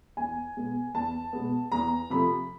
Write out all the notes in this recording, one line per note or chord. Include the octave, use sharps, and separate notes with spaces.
E2 G#5
B2 G#3 B3
E2 A5
B2 G#3 B3
E2 A#5
C3 F3 A3 B5